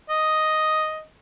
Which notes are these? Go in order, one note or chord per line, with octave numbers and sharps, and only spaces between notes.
D#5